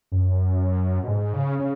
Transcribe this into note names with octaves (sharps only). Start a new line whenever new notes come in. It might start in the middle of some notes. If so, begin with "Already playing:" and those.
F#2
B2
G#2
C#3
C#3